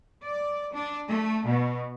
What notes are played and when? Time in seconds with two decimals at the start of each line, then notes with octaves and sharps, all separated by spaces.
0.23 D5
0.73 D4
1.08 A3
1.46 B2